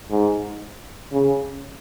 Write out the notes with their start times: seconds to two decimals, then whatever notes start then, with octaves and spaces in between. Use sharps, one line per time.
0.11 G#2
1.13 C#3